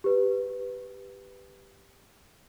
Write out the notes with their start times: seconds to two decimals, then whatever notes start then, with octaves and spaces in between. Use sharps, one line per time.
0.04 G4 B4